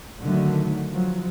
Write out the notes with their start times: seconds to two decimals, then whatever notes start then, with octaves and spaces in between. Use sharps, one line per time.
0.22 D3 D#3 F#3 A3
0.92 F3 F#3